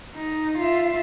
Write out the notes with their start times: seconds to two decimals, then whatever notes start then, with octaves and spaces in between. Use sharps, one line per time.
0.15 D#4
0.58 F4 E5